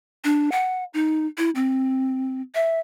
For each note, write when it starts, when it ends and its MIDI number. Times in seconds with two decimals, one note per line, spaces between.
0.24 0.50 62
0.52 0.84 78
0.94 1.26 63
1.38 1.50 64
1.55 2.42 60
2.55 2.80 76